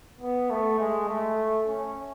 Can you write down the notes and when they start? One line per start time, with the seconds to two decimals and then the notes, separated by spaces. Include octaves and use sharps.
0.21 B3
0.50 A3
0.80 G#3
1.09 A3
1.68 C#4